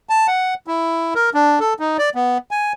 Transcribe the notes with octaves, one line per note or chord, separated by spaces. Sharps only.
A5
F#5
E4
A#4
D4
A4
D#4
D5
B3
G#5